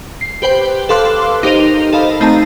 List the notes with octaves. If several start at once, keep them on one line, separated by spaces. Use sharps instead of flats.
C7
G4 B4 C5 G5
A4 B4 F5 C6 D6 F#6
D#4 G4 A#4 C5 D#5 F7
A4 D#5 F5 B5
A3 C4 D#4 D#5 A5 A#5